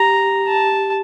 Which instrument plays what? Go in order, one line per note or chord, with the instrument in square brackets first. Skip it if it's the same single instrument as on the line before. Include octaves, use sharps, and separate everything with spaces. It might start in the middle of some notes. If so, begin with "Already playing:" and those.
Already playing: [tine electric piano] G4 [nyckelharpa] A#5
[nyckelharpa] A5